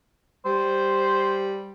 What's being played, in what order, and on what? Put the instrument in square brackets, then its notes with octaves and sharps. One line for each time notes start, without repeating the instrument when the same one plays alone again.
[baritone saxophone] G3 [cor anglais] C5